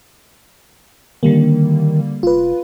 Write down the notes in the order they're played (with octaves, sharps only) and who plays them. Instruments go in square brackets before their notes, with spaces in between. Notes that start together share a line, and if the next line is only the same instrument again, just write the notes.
[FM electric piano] D3 G3 A#3 [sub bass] D#3
[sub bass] F1 [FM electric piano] F4 B4